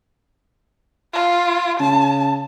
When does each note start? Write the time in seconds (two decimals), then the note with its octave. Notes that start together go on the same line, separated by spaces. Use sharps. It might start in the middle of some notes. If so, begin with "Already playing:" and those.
1.13 F4
1.80 C#3 A5